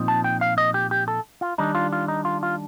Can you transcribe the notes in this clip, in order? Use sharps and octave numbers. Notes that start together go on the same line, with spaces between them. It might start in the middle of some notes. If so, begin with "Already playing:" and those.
Already playing: A#2 F3 C4 D#4
A5
G5
F5
D#5
G4
G4
A4
F4
D#3 G3 D4 D#4
F4
F4
D#4
F4
F4